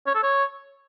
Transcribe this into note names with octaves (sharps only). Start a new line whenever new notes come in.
C#5
A4
C#5